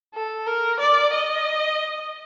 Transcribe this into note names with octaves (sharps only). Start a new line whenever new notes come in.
A4
A#4
D5
D#5